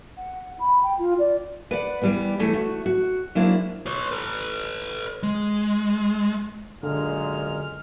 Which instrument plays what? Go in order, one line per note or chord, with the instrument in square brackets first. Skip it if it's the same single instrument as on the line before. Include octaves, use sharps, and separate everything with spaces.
[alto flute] F#5
B5
G5
F4
D5
[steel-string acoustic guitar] B4 D5 F#5
E3 G3 B3
E3 A3 C#4 A4
A3 F#4
F#4
F#3 G#3 A#3 C4 D4 E4
[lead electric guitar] B4 C#5
A4 B4
G#3
[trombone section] F#2 A#2 G#3 [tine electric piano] D3 [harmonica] F6